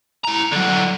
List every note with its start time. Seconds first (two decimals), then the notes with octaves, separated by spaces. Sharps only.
0.25 E4 A#5
0.53 D3 F#3